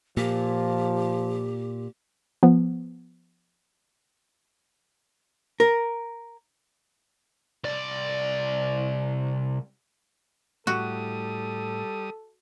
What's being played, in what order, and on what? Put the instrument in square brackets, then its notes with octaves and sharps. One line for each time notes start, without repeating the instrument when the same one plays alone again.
[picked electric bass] A#2 [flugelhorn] F3 [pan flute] G4
[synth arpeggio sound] F3 B3
[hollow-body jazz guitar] A#4
[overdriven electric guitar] C2 D5
[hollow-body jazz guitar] A2 [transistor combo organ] G3 D#6 [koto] F#4 [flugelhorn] A4